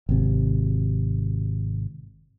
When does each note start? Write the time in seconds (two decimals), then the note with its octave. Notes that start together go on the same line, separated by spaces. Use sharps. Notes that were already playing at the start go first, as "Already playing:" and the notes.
0.09 G#1 C3